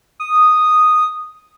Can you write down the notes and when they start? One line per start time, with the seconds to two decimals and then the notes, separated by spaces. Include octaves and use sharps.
0.20 D#6